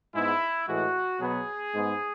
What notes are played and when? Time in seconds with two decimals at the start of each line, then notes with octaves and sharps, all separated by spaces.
0.14 G#2 G#3 B3 E4
0.67 A2 E3 G#3 F#4
1.20 B2 F#3 B3 G#4
1.73 G#2 G#3 B3